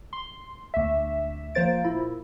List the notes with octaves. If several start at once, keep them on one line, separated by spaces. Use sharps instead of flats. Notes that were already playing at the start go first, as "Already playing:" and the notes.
C6
D2 E5
F3 A#3 C5 A6 D7
A#2 E4